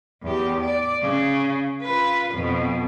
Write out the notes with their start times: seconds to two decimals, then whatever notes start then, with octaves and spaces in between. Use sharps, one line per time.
0.23 E2 G4
0.60 D5
1.02 C#3
1.82 F4 B4
2.34 F2 B2